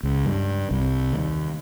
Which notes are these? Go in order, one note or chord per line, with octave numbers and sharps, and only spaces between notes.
C#2
G2
C2
D#2